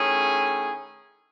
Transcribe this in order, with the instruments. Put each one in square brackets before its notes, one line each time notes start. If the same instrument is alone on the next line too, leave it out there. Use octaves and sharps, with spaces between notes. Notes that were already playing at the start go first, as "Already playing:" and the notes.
Already playing: [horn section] D#3 A3 C#4 E4 G#4